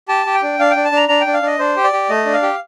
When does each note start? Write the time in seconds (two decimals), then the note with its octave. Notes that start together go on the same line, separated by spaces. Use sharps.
0.08 G4 A5
0.26 G4
0.34 G5
0.42 D4
0.59 D4 F5
0.71 D4 G5
0.85 A5
0.92 D4 A#5
1.08 D4 A#5
1.21 G5
1.26 D4
1.33 F5
1.42 D4 D#5
1.59 D4 C5
1.76 G4
1.84 D5
1.92 G4
2.09 A3 D#5
2.25 D4
2.33 F5
2.42 G4